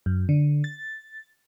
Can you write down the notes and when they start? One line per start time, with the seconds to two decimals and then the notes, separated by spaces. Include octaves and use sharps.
0.06 F#2
0.29 D3
0.64 A6